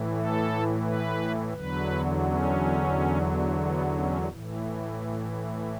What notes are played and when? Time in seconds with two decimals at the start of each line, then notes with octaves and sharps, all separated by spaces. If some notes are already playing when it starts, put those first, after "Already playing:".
Already playing: A2 E3
0.16 A4
0.84 B4
1.53 E2 D3 F#3 B4
2.22 C#4
3.59 B3
3.94 C#4
4.28 A2 E3